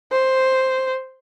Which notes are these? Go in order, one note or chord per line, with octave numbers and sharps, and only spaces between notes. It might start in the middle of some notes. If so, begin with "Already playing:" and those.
C5